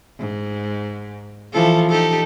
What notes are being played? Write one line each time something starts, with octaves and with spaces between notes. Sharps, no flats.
G#2
E3 F3 A4
D#4 G4 A4